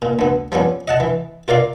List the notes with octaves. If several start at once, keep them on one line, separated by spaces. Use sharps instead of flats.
A#2
D2 B3
F3 G3 B3 C#4
D#5 F#5 A5
E3
F4 A#4 D5 F5